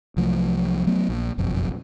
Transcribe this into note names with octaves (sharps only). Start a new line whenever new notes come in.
C2 F3 F#3 A3
F#3 A3 B3
A#1
F#1 B1 F2